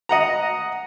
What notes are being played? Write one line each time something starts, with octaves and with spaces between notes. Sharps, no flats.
D#5 F#5 A#5